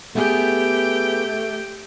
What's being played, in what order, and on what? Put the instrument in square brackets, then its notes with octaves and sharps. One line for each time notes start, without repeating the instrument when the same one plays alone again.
[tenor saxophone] A3 [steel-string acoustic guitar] B3 G#4 [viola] G4 G5